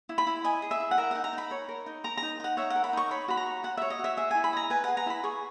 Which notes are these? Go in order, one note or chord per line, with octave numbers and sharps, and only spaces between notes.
E4
B5
E4
D#5 G#5
G#4
E5
E4
F#5
A#4 E5
D#4 F#5
A#5
D#4
B5
C#5
A#4
D#4
A#4 A#5
D#4 A#5
D#4 F#5
C#5 E5
F#5
A#4
B5
D#4 C#6
C#5 B5
F#4 B5
A#5
C#5
F#4 F#5
C#5 E5
D#5
F#4 E5
G#4 E5
E4 G#5
B5
D#5 A#5
B4 G#5
G#4 F#5
A#5
E4 B5
G#4 C#6